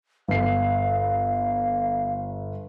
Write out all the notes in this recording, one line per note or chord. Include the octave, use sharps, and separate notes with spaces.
G1 F5 C7